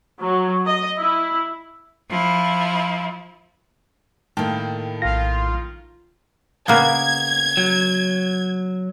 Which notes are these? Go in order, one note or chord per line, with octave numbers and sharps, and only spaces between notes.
F#3
D#5
E4
F3 E4
A2 D#3 A#3 G5 A5
A#1 F4 A#6
C#3 A#3 B3 G#6
F#3